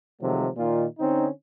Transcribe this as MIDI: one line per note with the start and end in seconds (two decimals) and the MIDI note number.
0.21 0.48 48
0.21 0.48 51
0.21 0.48 53
0.21 0.48 54
0.21 0.48 56
0.21 0.48 57
0.56 0.85 46
0.56 0.85 51
0.56 0.85 65
0.99 1.27 50
0.99 1.27 60
0.99 1.27 61
0.99 1.27 63